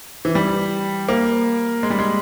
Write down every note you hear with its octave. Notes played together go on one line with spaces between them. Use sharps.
E3
G3
A#3
G#3
G3
G#3